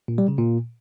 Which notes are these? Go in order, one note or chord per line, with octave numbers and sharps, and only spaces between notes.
A#2
G3
C#3
A#2